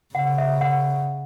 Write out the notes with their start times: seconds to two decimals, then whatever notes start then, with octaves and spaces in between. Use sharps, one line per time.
0.15 C#3 F#5
0.38 E5
0.61 F#5